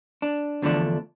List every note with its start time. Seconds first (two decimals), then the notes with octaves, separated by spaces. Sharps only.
0.22 D4
0.62 E2 D3 F3 A3 D4